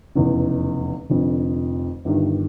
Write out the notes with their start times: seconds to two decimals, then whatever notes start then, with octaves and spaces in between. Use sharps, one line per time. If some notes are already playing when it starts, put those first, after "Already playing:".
0.15 F1 E2 C#3
1.10 F1 F2 D3
2.05 G1 G2 D#3